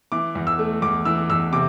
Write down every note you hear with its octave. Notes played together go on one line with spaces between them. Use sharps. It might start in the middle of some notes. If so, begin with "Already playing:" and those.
E3 D6
E2
E6
A3
E2 D6
E3 E6
E2 E6
C3 D6